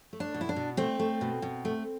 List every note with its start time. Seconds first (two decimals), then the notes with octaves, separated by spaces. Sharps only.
0.13 A3
0.20 D4
0.34 B2
0.41 E4
0.49 D4
0.56 B2
0.77 A3 C4
0.99 A3
1.21 B2
1.42 B2
1.65 A3